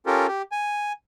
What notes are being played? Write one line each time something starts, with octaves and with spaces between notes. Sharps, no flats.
C#4 F4 G4 A4 A#4
G4
G#5